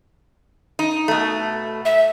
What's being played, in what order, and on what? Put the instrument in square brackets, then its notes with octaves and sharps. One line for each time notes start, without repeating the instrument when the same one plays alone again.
[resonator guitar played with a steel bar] D#4
B2 A3
[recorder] E5